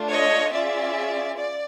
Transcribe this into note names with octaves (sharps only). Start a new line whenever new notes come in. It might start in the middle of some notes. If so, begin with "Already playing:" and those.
Already playing: A3 D4 F4
C#5 D#5
C#4 F4 G#4 D5 E5
D5